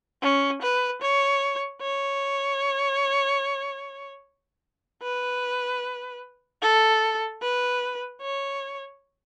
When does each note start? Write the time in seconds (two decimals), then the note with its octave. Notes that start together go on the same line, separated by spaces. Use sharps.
0.22 C#4
0.62 B4
1.02 C#5
1.82 C#5
5.02 B4
6.62 A4
7.42 B4
8.21 C#5